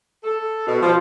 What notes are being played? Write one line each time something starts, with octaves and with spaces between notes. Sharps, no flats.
A4
B2
F3